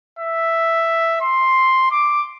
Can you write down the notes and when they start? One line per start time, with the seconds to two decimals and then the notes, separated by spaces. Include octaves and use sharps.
0.19 E5
1.21 C6
1.91 D6